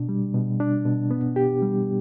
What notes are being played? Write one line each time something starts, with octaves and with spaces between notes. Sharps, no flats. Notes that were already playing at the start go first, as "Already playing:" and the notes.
Already playing: B2 D4
G3
B2
D4
B2
B3
G4
G3